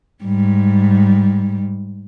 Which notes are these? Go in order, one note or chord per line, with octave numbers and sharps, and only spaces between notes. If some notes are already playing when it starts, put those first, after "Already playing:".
G#2 G3